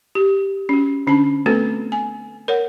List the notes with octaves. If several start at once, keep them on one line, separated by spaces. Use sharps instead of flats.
G4
C#4 F#4
D3 C#4 D4 A5
A3 B3 C4 F#4 A4 B4
G#5
A#4 C#5 F#5